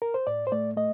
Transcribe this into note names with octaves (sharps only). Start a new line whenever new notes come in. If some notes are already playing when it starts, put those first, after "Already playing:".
A#4
C5
A2 D5
C5
A3 D5
A3 D#5